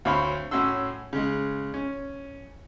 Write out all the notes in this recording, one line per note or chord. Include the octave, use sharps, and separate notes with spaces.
D2 C4 C#5 F5 B5
A2 C#4 F#4 C6 E6
C#3 G#3
C#4